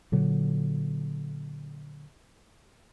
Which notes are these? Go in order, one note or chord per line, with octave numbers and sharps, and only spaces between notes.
A#2 D3 F#3